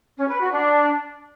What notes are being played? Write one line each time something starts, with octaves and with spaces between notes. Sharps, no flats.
C#4
B4
F#4
D4